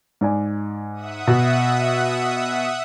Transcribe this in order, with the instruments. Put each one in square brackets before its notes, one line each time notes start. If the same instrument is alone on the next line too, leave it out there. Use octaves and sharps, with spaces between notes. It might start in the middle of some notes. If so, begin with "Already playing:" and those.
[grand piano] G#2 D5 G#5
[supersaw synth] E5 F#5 D#6
[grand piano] B2